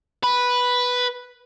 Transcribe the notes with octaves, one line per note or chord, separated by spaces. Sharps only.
B4